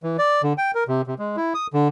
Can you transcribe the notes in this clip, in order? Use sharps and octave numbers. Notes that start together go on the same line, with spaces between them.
E3
D5
D3
G5
A#4
C3
C3
G#3
E4
D#6
D3